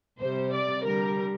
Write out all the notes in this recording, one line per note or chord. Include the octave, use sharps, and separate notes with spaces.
C3 G3 C5
D5
D3 G3 A#4